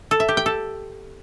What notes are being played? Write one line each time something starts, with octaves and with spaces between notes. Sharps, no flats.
A4
E5
G4
G5
A4